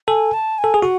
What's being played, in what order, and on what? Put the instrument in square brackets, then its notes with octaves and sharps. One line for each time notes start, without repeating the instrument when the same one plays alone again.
[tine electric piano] A4 [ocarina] G#5
[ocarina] A5
G#5
[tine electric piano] A4
G#4
[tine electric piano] F#4 [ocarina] F#5